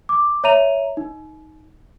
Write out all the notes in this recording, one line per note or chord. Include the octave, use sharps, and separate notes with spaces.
D6
C#5 E5 A#5 D#7 F7
D#4